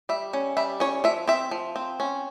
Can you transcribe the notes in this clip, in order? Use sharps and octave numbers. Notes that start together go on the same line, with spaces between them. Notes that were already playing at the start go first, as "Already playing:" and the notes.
G3 E5
C#4
G3 E5
C#4 C#5
F3 E5
C4 E5
F3
C4
C#4